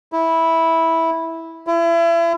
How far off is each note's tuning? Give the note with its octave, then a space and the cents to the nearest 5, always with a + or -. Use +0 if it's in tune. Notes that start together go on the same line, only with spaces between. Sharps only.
E4 -10
E4 +35